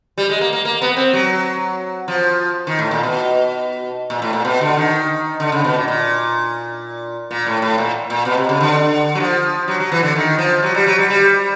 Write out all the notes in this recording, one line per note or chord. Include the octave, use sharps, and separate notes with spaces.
G3
G#3
A#3
A#3
A#3
B3
C4
F#3
F3
D#3
A2
A#2
B2
A#2
A2
A#2
B2
D3
D#3
D3
C#3
B2
A#2
A#2
A#2
A2
A2
A#2
A#2
B2
C3
C#3
D3
F#3
F3
F#3
F#3
E3
D3
D#3
F3
F#3
G3
F#3
G3
G3